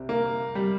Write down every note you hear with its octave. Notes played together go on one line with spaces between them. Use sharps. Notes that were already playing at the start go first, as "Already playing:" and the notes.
Already playing: C2 C3
A#3
G3